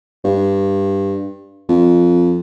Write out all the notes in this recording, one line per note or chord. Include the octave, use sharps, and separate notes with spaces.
G2
F2